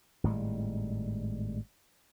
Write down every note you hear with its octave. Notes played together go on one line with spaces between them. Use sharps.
G#1 A2 G3 G#3